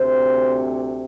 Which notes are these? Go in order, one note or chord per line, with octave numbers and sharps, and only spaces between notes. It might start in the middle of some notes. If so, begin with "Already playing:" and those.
Already playing: D2 C3 C5